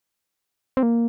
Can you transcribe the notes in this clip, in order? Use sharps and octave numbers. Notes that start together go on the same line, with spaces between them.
C4
A#3